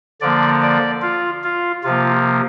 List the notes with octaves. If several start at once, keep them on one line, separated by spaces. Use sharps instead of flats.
D3 F3 A#3 D5
D5
F4
F4
C3 F3 A#3 F4